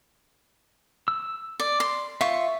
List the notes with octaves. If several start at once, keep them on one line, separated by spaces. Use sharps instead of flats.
E6
D5
C6
F4 E5 C#6